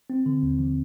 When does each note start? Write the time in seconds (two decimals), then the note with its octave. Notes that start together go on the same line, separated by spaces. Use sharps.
0.10 C4
0.26 D3
0.43 D#2
0.59 F3